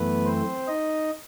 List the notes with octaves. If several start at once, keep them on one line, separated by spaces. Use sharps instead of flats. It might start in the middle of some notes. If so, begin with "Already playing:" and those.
Already playing: F#2 E3 A3 B3 B4
C4 C5
D#4 D#5